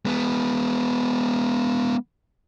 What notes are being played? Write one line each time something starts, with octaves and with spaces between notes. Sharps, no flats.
G#3 B3